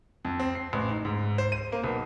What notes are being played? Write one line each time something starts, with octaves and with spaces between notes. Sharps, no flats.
F2
C4
C7
A1
D#4
G#2
C5
D#7
A#3
B1